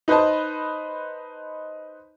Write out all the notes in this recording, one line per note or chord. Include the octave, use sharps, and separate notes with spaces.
D#4 B4 C5 D#5 A5